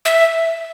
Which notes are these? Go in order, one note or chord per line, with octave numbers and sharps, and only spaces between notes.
E5